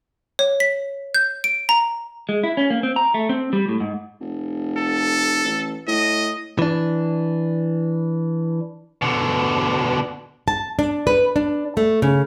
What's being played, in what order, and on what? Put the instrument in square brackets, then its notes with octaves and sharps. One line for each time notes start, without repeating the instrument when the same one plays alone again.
[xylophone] C#5
B6
G6
D7
A#5
[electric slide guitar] G#3
E4
C#4
A#3
C4
A#5
A3
C4
G3
A2
G#2
[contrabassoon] F1
[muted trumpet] A4
[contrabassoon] A1
[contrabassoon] A2 [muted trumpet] D#5
[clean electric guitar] E3 D4
[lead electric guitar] B2 D3
[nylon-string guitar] A5
D4
B4
D4
A3
C#3